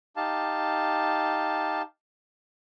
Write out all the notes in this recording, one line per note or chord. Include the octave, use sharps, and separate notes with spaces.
D#4 G4 F5 A5